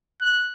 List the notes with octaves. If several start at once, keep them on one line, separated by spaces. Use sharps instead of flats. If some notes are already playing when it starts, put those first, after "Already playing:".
F#6